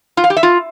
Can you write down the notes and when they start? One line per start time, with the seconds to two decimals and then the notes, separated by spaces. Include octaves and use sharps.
0.17 F4
0.24 F5
0.30 G4
0.37 E5
0.43 F4